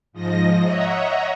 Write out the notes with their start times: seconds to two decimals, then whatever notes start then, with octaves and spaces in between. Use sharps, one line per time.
0.13 G#2 F3 D#5 A#6
0.64 C#5 D#5 E5 F#5 A#5